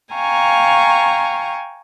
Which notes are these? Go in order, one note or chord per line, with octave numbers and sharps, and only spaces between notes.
F5 G5 G#5 A#5 C#6